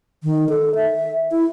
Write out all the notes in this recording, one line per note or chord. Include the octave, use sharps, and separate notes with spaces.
D#3
A4
E5
E4